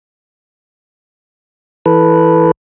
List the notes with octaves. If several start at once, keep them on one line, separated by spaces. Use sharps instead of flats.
E3 A4 B4